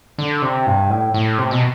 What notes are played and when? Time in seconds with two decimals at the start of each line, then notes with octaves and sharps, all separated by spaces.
0.18 D3
0.42 C3
0.67 G2
0.90 A2
1.14 A2
1.38 C3
1.51 B2